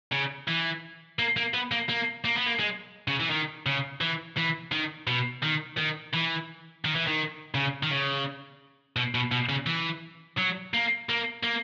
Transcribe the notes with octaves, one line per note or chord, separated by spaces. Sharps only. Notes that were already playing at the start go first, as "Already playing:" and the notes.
C#3
E3
A#3
A#3
B3
A#3
A#3
A#3
B3
A#3
G#3
C#3
E3
D#3
C#3
E3
E3
D#3
B2
D#3
D#3
E3
D#3
E3
D#3
C#3
D#3
C#3
B2
B2
B2
C#3
E3
F#3
A#3
A#3
A#3